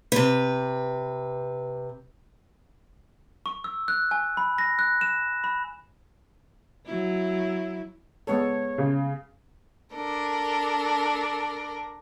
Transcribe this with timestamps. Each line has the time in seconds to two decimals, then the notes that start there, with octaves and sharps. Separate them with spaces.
0.12 C3 B4
3.46 C#6
3.64 E6
3.88 F#6
4.11 G#5
4.37 B5
4.58 A#6
4.79 F#6
5.01 E7
5.44 B5
6.86 F#3 E4
8.27 G#3 B3 A4 C#5
8.78 C#3
9.93 D4 A4 A#4